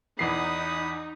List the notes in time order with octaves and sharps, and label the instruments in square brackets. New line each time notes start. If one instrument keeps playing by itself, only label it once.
[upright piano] E2 E3 C7 [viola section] D#4 [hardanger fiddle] F#5 D#6 [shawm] B5